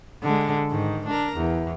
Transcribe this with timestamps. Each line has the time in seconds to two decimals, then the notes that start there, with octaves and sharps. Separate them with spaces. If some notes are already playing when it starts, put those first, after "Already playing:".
0.23 D3 G#3
0.71 G#2 D#3
1.07 D4 A#4
1.37 E2